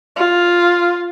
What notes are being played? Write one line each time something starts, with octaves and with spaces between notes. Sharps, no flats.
F4